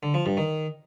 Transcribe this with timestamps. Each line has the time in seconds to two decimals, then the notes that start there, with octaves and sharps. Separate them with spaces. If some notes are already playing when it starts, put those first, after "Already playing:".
0.03 D3
0.14 F3
0.26 G2
0.37 D#3